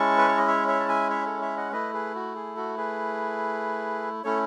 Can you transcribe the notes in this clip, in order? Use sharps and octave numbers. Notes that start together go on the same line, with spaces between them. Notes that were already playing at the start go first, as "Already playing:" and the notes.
Already playing: G#3 C#4 E4 A5 C#6
B4
C#5
D#5
C#5 E5
C#5 E5
A5
E5 G#5
C#5 E5
A4 C#5
C#5 E5
D#5 F#5
A3 E4 B4 D#5
G#4 B4
F#4
G#4
F#4 A4
G#4 B4
A3 C#4 E4 A4 C#5